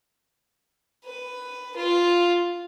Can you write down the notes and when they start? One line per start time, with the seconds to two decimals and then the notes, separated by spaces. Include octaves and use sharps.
1.04 B4
1.76 F4